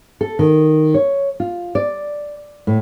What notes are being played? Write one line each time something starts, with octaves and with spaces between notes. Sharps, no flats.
A4
D#3
C#5
F4
D5
A2